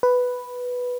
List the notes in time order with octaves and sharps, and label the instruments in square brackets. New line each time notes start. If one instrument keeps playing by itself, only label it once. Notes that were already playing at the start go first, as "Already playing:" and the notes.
[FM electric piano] B4